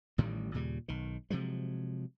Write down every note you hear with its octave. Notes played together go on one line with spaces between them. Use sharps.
A1 A2 D#3 G3
D#2 A#2 C#3 G3
B1 D#3
C3 F3 F#3 G#3